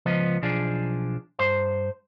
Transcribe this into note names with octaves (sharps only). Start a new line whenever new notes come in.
C#2 F3 B3 D#5
B1 F3 D4 G#4
G2 C5 C6